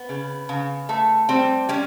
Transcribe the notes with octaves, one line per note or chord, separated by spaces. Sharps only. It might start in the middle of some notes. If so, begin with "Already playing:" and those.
Already playing: B3
C#3
C#3
A3
G3 C4
G3 C#4